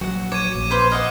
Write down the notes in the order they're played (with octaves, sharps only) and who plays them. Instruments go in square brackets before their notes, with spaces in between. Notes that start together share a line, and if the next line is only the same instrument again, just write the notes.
[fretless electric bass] A#1 F#3 [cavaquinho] F#4 F#5
[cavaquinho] C#5 [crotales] D6 G#6 D#7
[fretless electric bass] A#1
[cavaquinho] B4 C5 F5 [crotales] D6
[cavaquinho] D#5 F5 F#5 [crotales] F6